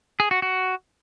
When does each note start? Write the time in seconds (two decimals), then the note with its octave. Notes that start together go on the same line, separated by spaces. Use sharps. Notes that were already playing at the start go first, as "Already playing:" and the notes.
0.20 G#4
0.31 F#4
0.42 F#4